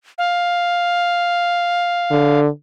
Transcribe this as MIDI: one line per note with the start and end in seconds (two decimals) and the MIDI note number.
0.18 2.40 77
2.11 2.48 50